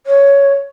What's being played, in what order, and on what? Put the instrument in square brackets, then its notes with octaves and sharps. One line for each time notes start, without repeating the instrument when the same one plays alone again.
[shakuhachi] C#5